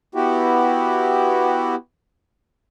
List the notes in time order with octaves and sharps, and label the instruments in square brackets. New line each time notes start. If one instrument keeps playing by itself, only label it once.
[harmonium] B3 E4 F#4 G4